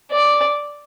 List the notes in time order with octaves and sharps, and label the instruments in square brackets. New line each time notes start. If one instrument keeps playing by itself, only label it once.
[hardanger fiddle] D5